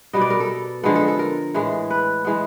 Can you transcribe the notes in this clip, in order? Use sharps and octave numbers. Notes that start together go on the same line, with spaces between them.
B2 G3 B3 D#5
D5
A#4
A4
D3 F3 G#3 B3 A4
A4
A4
A#4
A2 E3 G#3
B4
E3 G#3 B3